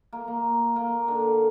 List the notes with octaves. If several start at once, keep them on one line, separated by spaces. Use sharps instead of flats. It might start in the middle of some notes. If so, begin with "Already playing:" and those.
A#3
A#3
A#3
D3